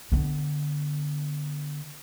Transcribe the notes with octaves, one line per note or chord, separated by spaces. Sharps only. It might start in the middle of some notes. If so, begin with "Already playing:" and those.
D3 B3